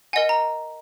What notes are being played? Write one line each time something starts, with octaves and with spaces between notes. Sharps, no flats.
A#4 D#5 F#5 G#5
A#5